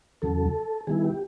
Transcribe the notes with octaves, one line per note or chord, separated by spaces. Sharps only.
E2 C#3 F#3 A4
D#3 G3 B3 E4 G#4
G4